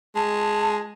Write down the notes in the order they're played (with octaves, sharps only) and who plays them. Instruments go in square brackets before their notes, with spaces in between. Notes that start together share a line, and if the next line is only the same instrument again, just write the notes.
[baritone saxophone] G#3 [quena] A5